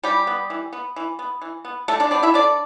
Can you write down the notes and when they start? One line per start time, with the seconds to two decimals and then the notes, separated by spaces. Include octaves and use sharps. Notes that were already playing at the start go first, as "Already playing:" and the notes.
0.04 E3 G3 G4
0.27 B3
0.50 E3
0.73 B3
0.96 E3
1.19 B3
1.42 E3
1.65 B3
1.88 D3 A3 A4
2.00 D4 D5
2.11 G3 B3 D4 D5
2.23 E4 E5
2.34 D3 D4 D5